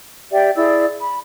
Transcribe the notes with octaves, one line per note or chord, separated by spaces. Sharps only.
G4 D5 E5 G5
E4 G#4 D5 E6
B5